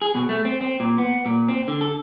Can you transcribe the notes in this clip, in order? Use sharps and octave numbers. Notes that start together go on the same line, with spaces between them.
G#4
B2
A3
C4
C4
A#2
B3
A#2
C4
D3
A4